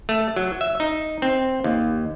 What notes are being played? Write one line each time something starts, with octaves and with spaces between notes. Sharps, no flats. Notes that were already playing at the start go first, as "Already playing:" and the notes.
A3
F#3
E5
D#4
C4
D#2